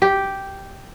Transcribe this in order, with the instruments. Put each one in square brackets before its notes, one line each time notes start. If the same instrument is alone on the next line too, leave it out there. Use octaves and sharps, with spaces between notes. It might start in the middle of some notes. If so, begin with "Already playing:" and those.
[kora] G4